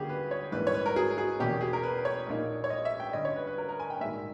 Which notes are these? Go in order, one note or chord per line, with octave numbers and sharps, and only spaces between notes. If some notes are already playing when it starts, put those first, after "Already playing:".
Already playing: G1 G2 G3 A#3 C#4 G4 G#4
B4
C#5
A#1 G#2 E3 G3 A#3 B4
C#5
B4
A#4
G#4
G#4
E2 B2 A#3 C#4 G4
G#4
A#4
B4
C#5
A#1 A#2 A#3 D#4
C#5
D#5
E5
G5
G1 G2 G3 C#4 D#5
C#5
B4
B4
A#4
A#4
G#5
G5
A#1 G#2 D#3 G3 A#3 E5